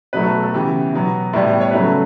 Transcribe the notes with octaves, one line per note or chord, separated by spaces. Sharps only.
B2 F#3 A3 B4
A4
A4
C#3 E3 B3 G4
B2 F#3 B3
A2 G3 B3 E4
G4
C#5
C#3 F#3 A3 B4
A4